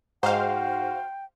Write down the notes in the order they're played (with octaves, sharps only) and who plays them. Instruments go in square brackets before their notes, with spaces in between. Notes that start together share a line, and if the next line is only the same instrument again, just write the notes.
[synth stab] G#2 [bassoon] F#4 [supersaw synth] C5 F5 [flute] G5